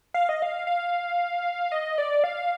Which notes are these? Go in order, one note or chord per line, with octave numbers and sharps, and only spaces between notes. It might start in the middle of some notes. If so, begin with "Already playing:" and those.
F5
D#5
F5
F5
D#5
D5
F5